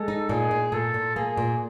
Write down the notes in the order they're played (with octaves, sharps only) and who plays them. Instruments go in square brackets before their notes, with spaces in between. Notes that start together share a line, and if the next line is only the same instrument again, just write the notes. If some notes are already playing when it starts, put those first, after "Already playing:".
Already playing: [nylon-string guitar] G#3 [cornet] A4
[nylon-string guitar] D#4
[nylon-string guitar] A#2 [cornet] G#4
[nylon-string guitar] A#2
[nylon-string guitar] A#2 [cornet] A4
[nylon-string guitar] A#2
[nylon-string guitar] A#3 [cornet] G#4
[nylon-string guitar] A#2